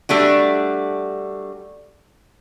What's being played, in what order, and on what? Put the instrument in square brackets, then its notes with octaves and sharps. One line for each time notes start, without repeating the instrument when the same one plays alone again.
[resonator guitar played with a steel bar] G3 A3 D4 F#4